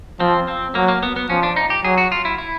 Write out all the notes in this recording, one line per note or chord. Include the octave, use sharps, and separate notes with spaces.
F3 C4
C4
F#3 A#3
A#3
B3
B3
F3 C#4
D4
D#4
G4
F#3 G#4
F#4
F4
E4
E4